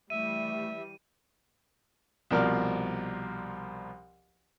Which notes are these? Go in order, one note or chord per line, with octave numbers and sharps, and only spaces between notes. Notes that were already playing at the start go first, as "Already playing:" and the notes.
E3 G3 A3 E5 D#7
C2 B2 F3 A#4 D5 F6